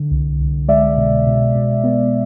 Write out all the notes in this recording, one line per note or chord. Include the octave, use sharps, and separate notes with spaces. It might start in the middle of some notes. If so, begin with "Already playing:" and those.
Already playing: D3
C2
C2
G#3 D5 E5
B2
B2
B2
B3